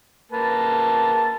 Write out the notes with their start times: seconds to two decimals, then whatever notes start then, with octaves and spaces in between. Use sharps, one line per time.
0.32 A#3 B4 A5